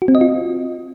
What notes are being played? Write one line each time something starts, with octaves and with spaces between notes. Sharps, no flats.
F#4
C4
D#5
F4